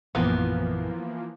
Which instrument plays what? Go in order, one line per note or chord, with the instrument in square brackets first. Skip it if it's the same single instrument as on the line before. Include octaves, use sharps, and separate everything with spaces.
[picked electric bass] A#1 F#2 [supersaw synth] E3 F3 A#3 [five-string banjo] B3